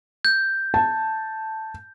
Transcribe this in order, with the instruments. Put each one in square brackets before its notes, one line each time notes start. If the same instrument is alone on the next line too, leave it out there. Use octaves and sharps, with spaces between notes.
[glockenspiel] G6
[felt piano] A5